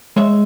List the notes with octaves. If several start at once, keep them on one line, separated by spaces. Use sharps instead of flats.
G#3 C#5 E5